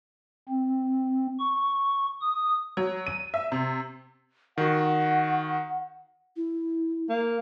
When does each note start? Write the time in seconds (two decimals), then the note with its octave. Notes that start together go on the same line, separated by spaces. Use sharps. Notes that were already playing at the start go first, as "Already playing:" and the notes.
0.49 C4
1.39 C#6
2.22 D#6
2.77 F#3
3.07 D#7
3.34 E5
3.52 C3
4.58 D#3 F#4 F#5
6.36 E4
7.09 A#3